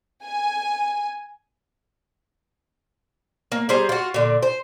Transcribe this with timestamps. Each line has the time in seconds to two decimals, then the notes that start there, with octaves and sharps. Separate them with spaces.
0.25 G#5
3.52 A#3
3.69 G3 G#4 C5 A#5
3.89 F4 F#4
4.14 A#2 D3
4.43 C5